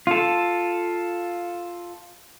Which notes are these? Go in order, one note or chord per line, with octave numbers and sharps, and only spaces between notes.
F4 A4